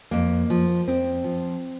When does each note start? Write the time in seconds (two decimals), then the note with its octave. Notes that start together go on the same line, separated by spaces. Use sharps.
0.11 F2 A#3
0.50 F3
0.88 F2 C4
1.24 F3